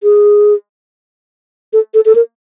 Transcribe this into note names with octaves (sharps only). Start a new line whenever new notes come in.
G#4
A4
A4
A4
A#4